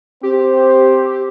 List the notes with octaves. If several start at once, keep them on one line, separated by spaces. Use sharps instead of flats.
C4 G4 C5